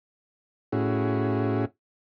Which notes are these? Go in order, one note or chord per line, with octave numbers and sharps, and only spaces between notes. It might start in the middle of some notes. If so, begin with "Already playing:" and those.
A2 C#4 E4 F#4 G#4